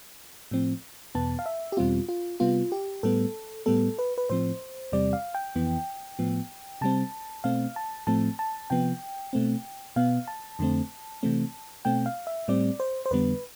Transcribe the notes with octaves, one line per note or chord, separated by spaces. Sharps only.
A2 F3 C4
E2 B2 B3 A5
F5
E5
G4
E2 B2 G3 C4 F4
F4
C3 G3 B3 F4
G4
A2 G3 B3 A4
A2 G3 B3 A4
B4
B4
A2 F3 C4 C5
E2 C3 G3 C4 D5
F5
G5
F2 E3 B3
A2 F3 B3
C3 G3 C4 A5
B2 A3 C4 F5
A5
A2 F3 A3 C4 A5
A5
C3 F3 B3 G5
B2 A3 C4
B2 B3 F5
A5
F2 D3 A3 C4
C3 E3 A3 C4
B2 A3 C4 G5
F5
E5
A2 G3 C4 D5
C5
C5
F2 D3 G3 B3 B4